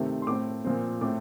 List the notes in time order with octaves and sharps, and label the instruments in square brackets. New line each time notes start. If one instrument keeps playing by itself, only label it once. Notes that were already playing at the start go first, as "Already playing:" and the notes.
Already playing: [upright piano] C3 D#3 A3 C4
C6
A2 A3 C4 D6
A#2 F3 C4
A2 A3 C4 D6